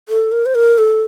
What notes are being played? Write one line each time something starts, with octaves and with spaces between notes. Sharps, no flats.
A4
A#4
C5
A#4
A4